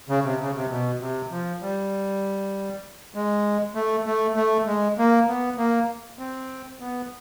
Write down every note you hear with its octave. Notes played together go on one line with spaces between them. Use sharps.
C#3
C3
C#3
C3
B2
C3
F3
G3
G#3
A3
A3
A3
G#3
A#3
B3
A#3
C4
B3